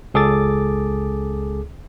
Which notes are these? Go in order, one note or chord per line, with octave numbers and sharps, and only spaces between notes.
C#2 G#4 A4 D6 A6